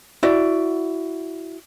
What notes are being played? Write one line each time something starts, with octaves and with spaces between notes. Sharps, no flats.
E4 F#4 D5